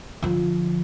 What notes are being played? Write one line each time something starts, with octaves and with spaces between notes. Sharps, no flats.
D3 F3